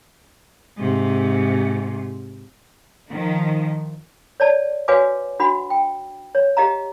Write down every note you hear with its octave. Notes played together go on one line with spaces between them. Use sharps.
G#2 C3
D#3 F3
C#5 D5 A5
F#4 B4 C#5 F5 G#5 D6
D4 F#4 F#5 B5
G5
C#5
G4 D#5 F5 A#5